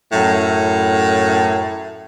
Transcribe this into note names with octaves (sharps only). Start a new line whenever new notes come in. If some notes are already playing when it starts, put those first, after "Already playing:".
F#2 A2